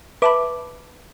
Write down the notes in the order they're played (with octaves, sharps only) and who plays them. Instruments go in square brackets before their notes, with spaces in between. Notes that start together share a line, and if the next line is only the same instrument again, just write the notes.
[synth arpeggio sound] B4 D6 [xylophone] E5 A5 B5